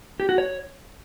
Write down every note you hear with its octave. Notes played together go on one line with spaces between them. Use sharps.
G4
F#4
C#5